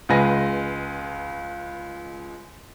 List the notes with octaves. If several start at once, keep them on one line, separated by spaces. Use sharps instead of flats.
C#2 G#3 B4 G#5 A#6